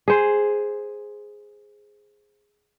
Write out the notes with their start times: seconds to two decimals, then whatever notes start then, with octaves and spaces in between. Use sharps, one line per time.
0.08 G#4 C5